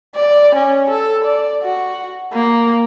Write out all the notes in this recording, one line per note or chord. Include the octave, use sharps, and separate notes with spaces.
D5
C#4
A4
D5
F#4
A#3